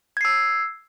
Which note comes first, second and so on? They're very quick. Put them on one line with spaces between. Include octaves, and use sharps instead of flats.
G#6 C7 E6